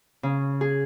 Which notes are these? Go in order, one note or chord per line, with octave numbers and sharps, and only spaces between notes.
C#3
G#4